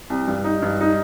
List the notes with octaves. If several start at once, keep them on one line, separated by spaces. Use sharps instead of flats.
C2
G2
D#4
G2
D#4